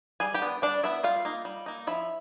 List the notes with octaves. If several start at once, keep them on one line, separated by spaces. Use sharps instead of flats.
G3 G#4 G#5
G4 G5
B3 D4
G3 D4 D5
B3 D4 E4 E5
G3 F4 F5
A#3 D#4
G3
A#3 D#4
F3 E4 E5